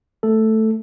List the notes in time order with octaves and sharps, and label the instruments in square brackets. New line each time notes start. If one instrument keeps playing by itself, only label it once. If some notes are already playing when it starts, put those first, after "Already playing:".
[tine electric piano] A3 A4